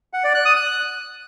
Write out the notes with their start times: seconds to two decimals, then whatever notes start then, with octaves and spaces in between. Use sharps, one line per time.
0.13 F#5
0.24 D5
0.35 F#6
0.45 D#6
0.56 F#6